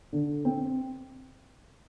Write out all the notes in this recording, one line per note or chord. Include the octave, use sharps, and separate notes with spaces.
D3
C4